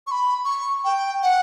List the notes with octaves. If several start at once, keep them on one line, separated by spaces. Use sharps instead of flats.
C#6
B5
C#6
G5
F#5